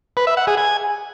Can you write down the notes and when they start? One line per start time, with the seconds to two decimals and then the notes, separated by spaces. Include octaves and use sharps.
0.17 B4
0.27 E5
0.37 F#5
0.47 G#4
0.57 G#5